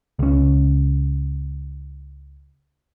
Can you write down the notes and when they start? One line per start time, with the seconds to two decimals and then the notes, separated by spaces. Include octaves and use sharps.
0.19 C#2 C#4